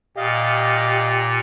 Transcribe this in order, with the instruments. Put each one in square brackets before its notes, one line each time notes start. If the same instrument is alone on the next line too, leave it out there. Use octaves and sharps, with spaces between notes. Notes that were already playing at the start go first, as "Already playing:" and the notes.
[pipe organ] A#2 [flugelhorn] G4 [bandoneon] D#5 F5